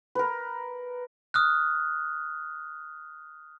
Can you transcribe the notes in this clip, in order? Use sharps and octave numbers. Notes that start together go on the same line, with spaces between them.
A#4 B4
D#6 F6 F#6